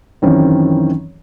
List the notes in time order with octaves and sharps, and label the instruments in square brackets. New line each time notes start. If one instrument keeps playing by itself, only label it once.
[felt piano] F#2 D#3 E3 C4 C#4